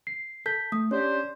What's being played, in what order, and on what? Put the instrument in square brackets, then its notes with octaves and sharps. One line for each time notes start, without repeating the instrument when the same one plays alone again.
[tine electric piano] C7
[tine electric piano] A4 A5 G6 [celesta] B6
[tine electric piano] A3 [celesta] D#6
[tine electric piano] C#4 [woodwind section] D4 G4 C5 [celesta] C#5